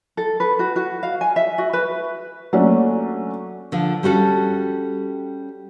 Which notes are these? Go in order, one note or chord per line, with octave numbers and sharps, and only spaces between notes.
A4
B4
F#4
F#4
F5
G#5
E5
F#4
B4
F#3 A3 A#3 C#4 D4
D3 F3
G3 C#4 F#4 A4